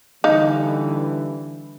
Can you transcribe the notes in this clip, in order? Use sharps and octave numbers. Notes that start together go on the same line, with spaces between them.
D3 E3 G3 D#4 F5